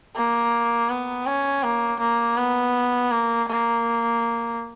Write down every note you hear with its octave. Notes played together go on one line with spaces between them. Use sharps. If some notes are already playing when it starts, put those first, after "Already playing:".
A#3
B3
C#4
A#3
A#3
B3
A#3
A#3